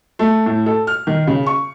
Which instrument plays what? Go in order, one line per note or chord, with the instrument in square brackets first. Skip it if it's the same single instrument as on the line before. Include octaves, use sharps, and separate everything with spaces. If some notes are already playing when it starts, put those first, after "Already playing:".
[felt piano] A3
A2
A4
F6
D#3
C#3
C#6